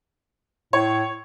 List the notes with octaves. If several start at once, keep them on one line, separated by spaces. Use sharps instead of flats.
A2 C#5